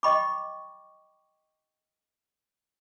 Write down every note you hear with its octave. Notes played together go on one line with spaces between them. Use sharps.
D#5 G5 B5 C#6 D6